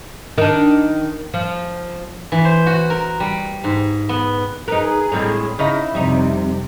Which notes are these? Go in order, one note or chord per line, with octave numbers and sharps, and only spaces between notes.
D#3 D4
F3
E3
C5
F#4
A#4
G3
G#2
B3
D#4 G#4 A#4 B4
A2 G3 G#3 C4 A#5
C#3 D#4 E4 D#5
F2 C3 G3 D#4